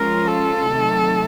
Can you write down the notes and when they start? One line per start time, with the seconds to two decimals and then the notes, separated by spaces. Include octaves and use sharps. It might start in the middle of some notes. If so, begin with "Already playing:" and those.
Already playing: F3 G#3 C#4 F4 A#4
0.28 A4
0.69 C3 D#3 F#3 A3